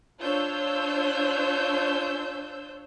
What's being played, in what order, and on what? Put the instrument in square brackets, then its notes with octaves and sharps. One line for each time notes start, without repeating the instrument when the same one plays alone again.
[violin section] D4 F4 C5 C#5 E6 G6